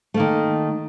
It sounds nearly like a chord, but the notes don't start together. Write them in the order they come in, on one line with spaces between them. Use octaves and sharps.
A3 A#3 D#3